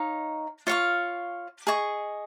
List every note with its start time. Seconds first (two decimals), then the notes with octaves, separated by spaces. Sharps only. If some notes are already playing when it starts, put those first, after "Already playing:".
Already playing: D#4 C#5 F5
0.67 F4 C#5 F5 C#6
1.67 G#4 D#5 C#6